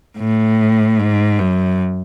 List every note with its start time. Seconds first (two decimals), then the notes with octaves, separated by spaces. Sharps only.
0.18 A2
0.98 G#2
1.39 F#2